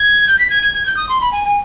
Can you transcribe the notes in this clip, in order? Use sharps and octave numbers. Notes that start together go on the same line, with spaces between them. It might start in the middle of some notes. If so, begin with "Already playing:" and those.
Already playing: G#6
G6
B6
G#6
G#6
G#6
G6
D#6
C6
B5
G#5
G#5